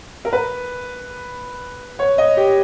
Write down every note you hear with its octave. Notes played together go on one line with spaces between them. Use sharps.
A#4
B4
C#5
D#5
G4